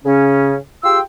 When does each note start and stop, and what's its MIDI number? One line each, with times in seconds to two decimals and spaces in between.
0.05 0.56 49
0.05 0.56 61
0.84 1.00 65
0.84 1.00 67
0.84 1.00 68
0.84 1.00 79
0.84 1.00 84
0.84 1.00 88